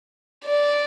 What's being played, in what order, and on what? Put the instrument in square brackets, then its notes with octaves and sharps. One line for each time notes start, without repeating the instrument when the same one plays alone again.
[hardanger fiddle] D5